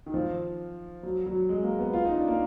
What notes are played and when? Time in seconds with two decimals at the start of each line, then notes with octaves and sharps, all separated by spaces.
0.06 D#3
0.14 F3
1.03 F#3
1.26 F#3
1.49 G#3
1.63 A#3
1.79 B3
1.93 F4
2.05 D#4
2.17 D4
2.27 A#3